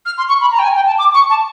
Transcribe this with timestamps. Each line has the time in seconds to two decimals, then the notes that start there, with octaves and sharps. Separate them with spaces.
0.06 F6
0.18 C6
0.29 C#6
0.41 B5
0.52 A#5
0.59 G5
0.64 G#5
0.75 G5
0.87 A5
0.98 D6
1.14 C#6
1.30 A5